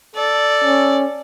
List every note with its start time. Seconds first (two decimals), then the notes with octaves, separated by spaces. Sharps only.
0.16 A4 D5
0.64 C#4